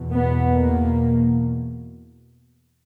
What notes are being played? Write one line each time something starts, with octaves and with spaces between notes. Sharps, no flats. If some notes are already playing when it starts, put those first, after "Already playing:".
Already playing: E2 B2
B3
A#3